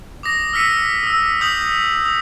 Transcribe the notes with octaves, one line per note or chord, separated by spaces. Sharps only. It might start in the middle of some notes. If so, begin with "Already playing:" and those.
D6 D#6 A#6
E6 F6 B6 C#7 D#7
D#6 E6
D#6 G6 B6 F7 F#7
D#6